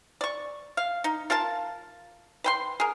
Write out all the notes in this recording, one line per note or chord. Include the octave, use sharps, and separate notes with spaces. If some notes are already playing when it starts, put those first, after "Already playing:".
D5 C#6
F5
D#4
F4 A#4 F5 A5
B4 G5 C6
G#4 A#4